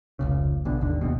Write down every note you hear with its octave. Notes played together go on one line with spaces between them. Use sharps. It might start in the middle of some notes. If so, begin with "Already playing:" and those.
F1 C#2 C#3
A1 B2 D3
G#1 D#2 D3
F1 A#1 D#2 B2